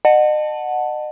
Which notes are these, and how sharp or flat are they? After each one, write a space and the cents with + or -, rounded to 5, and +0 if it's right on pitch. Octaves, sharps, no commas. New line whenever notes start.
D#5 -35 F#5 -5 A5 +0